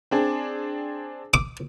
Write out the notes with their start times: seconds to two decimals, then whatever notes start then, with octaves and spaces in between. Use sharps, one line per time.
0.11 C4 D4 G#4
1.34 D6